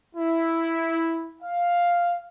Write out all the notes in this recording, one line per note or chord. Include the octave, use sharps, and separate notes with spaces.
E4
F5